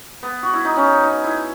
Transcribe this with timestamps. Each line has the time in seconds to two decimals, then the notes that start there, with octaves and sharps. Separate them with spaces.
0.23 B3
0.43 F#4
0.53 E4
0.65 D#4
0.76 C#4
1.04 D#4
1.24 E4